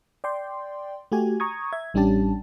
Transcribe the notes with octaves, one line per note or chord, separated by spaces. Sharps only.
D5 G5 C6
A3 F#4 G4 G#5
A#5 C#6 D#6 G#6
E5 G#6
A1 G3 C#4 D4 G4 A5